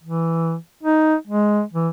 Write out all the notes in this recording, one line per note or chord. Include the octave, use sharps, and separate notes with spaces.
E3
D#4
G#3
E3